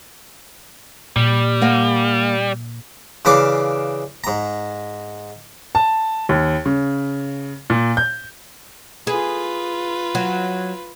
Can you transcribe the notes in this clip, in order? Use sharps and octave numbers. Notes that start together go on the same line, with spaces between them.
A#2 G3
A#3 F#5 G#5
C#3 E3 D4 F5 D6
G#2 A#5
A5
D#2
C#3
A#2
G6
F4 G#4 B4
F#3